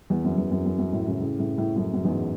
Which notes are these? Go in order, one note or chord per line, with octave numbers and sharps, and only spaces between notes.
E2
F#2
E2
F#2
F#2
F#2
F#2 A2
A2 C#3
A2 C#3
A2 C#3
A2 C#3
F#2 A2
F#2
E2 G#2